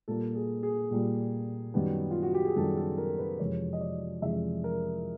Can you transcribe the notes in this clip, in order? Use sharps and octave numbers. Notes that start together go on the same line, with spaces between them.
A#2 G3 A#3 A4
G#4
G#4
A#2 G3 A#3
F#2 D#3 G3 B3
F4
F#4
G4
G#4
F#2 D#3 G3 B3 A4
A4
A#4
B4
F2 C3 E3 G#3 C#5
D#5
D5
F2 C3 E3 G#3 E5
A#4